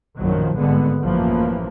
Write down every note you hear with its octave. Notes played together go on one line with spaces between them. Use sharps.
A#1 F#2 A2 D#3 F3 F#3
G#1 G2 D3 G#3 B3
A1 F#2 E3 F3 A#3